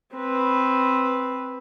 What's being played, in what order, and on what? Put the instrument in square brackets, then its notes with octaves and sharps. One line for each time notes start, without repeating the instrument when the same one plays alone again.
[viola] C4 B4